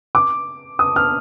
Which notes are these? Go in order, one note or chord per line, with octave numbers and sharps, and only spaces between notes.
D6
D#6
F6